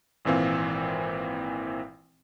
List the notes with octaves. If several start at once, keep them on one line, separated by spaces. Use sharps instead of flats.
G#1 A#2 E3 C4 F5